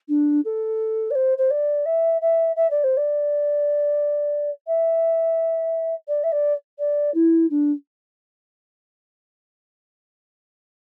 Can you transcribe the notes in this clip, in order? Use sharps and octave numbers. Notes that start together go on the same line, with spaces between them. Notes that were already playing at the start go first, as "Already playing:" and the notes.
D4
A4
D5
C5
C5
D5
E5
E5
E5
D5
C5
D5
E5
D5
E5
D5
D5
E4
D4